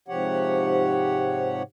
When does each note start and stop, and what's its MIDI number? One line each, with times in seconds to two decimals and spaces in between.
0.08 1.63 44
0.08 1.63 48
0.08 1.63 53
0.08 1.63 67
0.08 1.63 73
0.08 1.63 78